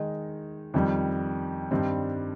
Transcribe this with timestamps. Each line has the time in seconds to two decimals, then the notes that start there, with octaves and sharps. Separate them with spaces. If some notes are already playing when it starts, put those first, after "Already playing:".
Already playing: D#3 G#3 D#4
0.74 F2 D#3 G3
1.71 G2 D#3 G3 C4